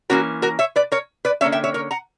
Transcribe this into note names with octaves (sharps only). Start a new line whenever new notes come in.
E3 A#3 C#4 F#4 A#4
F#4 A#4
C#5 E5
B4 D5
A#4 C#5
B4 D5
D3 A#3 C#4 C#5 E5
E5 G5
C#5 E5
A#4 C#5
F#5 A#5